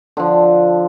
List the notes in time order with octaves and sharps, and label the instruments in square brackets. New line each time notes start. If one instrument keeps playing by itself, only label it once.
[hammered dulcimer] D3 F3